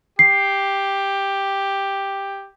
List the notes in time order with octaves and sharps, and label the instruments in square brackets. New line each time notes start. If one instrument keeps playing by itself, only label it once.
[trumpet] G4 [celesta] C7